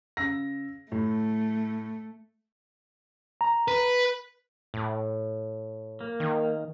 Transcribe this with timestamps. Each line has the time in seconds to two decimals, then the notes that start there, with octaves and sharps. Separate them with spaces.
0.17 C#3 E6 A#6
0.92 A2 A3
3.41 A#5
3.68 B4
4.74 A2
6.01 A#3
6.20 D#3